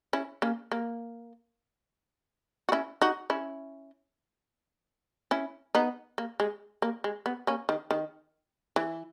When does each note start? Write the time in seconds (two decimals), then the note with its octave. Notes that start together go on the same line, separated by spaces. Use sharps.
0.13 C#4 E4
0.42 A#3 C#4
0.72 A#3
2.69 F#4
2.72 C#4 E4
3.02 D#4 F#4
3.30 C#4 E4
5.31 C#4 E4
5.75 B3 D#4
6.18 A#3
6.40 G#3
6.82 A#3
7.04 G#3
7.26 B3
7.47 A#3 C#4
7.69 D#3
7.91 D#3
8.76 E3